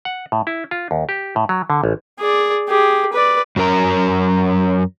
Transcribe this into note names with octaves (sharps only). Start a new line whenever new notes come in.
F#5
A2
E4
F4
D#2
G4
A2
F#3
D3
A1
G#4 D5
G4 G#4
B4 D5
F#2 F#3 C#4 A#4 A#5